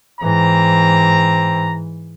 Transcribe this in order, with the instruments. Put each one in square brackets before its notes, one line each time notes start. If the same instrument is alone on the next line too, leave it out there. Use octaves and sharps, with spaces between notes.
[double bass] G#2 E3 [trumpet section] C4 A#5